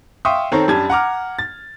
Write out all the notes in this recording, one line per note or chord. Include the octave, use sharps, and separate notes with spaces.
E5 F5 G5 C6 C#6 D#6
D#3 C4 A4 C#5 A#5
F#2 G3 D4 A5 G#6
F#5 A#5 D6 F6
A6